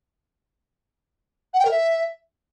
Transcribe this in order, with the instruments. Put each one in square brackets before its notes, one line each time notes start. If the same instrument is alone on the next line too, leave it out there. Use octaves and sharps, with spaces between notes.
[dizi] F#5
G5
A#4
E5